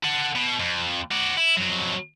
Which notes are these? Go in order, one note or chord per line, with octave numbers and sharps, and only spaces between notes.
A4 F#5
B2
F2
F#4 D5
E4
F2 F#3